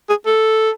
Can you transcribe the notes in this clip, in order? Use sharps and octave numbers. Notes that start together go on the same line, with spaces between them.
G#4
A4